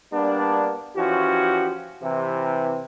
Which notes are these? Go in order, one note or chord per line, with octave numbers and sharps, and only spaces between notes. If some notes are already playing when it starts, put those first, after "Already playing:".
G3 A#3 B3 D4
E3 F3 C#4 F#4 G4
C3 E3